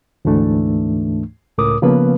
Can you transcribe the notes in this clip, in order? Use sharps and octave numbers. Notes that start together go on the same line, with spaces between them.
D2 G#2 E3 A3 D4
C#2 A2 A#4 D6 D#6
C#3 F3 A#3 B3 B4